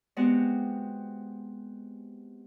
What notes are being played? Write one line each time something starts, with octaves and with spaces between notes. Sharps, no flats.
G#3 B3 C4 F#4 G4